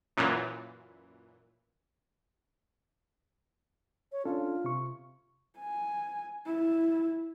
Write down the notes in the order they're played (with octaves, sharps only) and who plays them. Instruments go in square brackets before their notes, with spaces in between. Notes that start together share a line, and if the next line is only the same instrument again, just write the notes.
[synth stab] F#2 A#2 E3
[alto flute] C#5
[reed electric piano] C#4 D4 A4 [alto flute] F4
[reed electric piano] C3 C#6
[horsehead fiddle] G#5
E4